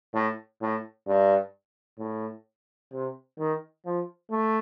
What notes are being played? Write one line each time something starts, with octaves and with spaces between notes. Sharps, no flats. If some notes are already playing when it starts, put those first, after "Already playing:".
A2
A2
G2
A2
C3
D#3
F3
A3